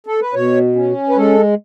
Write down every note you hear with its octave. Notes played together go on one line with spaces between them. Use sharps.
A4
B4
B2 C#5
C#4
B4
G#3 A4